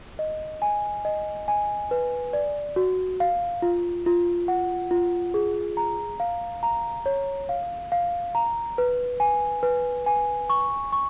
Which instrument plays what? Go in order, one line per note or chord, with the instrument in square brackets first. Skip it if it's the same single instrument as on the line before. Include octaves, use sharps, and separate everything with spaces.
[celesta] D#5
G#5
D#5
G#5
B4
D5
F#4
F5
F4
F4
F#5
F4
G#4
A#5
F5
A#5
C#5
F5
F5
A#5
B4
G#5
B4
G#5
C#6
C#6